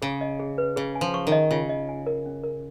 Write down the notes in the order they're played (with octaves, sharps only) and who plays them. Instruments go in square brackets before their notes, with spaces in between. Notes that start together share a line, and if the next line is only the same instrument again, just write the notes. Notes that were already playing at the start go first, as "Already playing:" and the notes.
[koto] C#3 [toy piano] G#4
[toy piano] D#5
G#4
B4
[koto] C#3 [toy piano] G#4
[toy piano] G#5
[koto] F3
[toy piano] C#6
[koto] D#3
[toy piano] D#5
[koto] C#3 [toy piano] F4
[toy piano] D#5
G#5
A#4
C#4
A#4